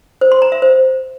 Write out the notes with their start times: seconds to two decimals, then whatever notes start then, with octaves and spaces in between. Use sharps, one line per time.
0.21 C5
0.32 C6
0.42 A#5
0.52 E5
0.62 C5